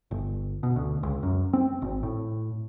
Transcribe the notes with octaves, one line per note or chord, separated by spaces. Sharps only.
G1
B2
D2
C#2
F#2
C4
G#1
A2